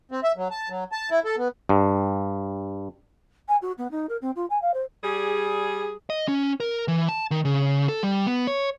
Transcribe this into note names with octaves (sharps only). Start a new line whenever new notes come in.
C4
E5
F#3
A5
F#3
A5
E4
A4
B3
G2
G#5
F#4
B3
D#4
A#4
C4
F4
G#5
F5
C5
G3 G#4
D#5
C#4
A#4
E3
A5
D#3
C#3
A4
G3
B3
C#5